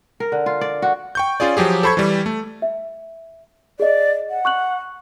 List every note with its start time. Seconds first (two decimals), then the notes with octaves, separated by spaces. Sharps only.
0.20 A#4
0.32 D3
0.46 F4
0.61 D5
0.82 F#4
1.15 G5 C#6 G6
1.40 C#4 F4 G#4 D5
1.57 F3 F#3 G4 G#4
1.83 A4 C5 B5 C#6 G#6
1.97 E3 G3
2.26 A3
2.62 E5
3.80 G#4 D5 D#5
4.30 F#5
4.45 C#6 F#6 F#7